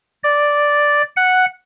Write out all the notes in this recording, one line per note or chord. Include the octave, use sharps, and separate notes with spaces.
D5
F#5